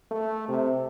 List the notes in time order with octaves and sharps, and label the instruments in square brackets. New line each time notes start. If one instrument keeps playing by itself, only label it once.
[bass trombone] A3
C3